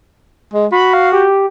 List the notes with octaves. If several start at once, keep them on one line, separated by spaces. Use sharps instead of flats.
G#3
F#4 B5
F5
G4